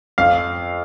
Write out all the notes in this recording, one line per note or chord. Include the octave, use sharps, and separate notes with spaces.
F2 F5